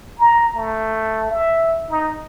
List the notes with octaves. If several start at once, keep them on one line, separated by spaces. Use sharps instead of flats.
A#5
A3
E5
D#4